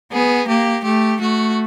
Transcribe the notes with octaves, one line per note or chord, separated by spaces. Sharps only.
B3 G#4
A#3 G4
A3 G4
A3 F#4